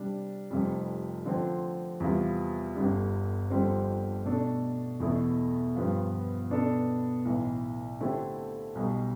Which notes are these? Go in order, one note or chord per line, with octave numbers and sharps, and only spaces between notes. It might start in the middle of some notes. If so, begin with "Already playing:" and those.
Already playing: C3 G3 D4
F1 F2 C3 G3
D3 F3 C4
E2 C3 G3 B3 F4
G1 G2 D3 G3
G1 F2 D3 G3 C4
B2 A3 D4 A4
E2 B2 A3 E4
G2 F3 B3 F4
B2 B3 D4 A4 D5
B1 A2 E3
D3 A3 C4 E4 G4
B1 B2 G3